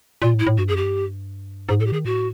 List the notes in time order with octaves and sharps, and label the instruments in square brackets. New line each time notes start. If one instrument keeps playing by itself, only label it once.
[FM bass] A#2 [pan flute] F4
[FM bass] A2
[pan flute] E4
[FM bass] A2
[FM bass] G2 [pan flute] F#4
[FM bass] F#2 [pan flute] G#4
[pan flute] G4
[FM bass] G2
[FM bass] G#2 [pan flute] G#4
[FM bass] A2 [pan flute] A4
[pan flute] G4
[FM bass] D#3 [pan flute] G#4
[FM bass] A2 [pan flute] F#4